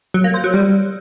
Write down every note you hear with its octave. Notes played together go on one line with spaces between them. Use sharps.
F#3
A#3
C5
F#3
G3